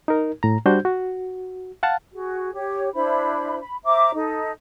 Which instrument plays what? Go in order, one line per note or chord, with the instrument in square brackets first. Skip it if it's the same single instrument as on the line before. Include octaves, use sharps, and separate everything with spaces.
[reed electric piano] D#4 A#4
A2 A#5
G3 D4 F#4 C5 G6
F#4
F5 F#5 A5
[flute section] F#4 G#4
G4 C#5
D4 E4 C5 B5
B5
C5 E5 A#5 D6
D#4 A4